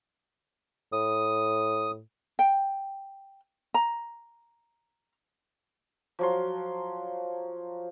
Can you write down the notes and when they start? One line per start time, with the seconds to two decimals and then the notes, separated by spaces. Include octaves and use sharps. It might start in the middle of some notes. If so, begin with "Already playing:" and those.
0.93 A2 D#6
2.39 G5
3.74 A#5
6.19 F3 F#3 C6